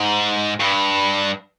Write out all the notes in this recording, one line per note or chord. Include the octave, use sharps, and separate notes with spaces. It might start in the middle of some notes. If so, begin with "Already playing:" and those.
Already playing: G#2
G2